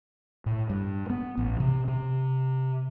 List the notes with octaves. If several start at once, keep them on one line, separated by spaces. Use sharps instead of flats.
A2
G2
B3
A1
C3
C3